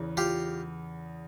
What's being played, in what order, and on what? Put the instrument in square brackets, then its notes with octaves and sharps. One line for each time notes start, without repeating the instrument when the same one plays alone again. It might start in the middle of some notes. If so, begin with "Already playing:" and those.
Already playing: [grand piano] E2 C#3 E3
[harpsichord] F4 G4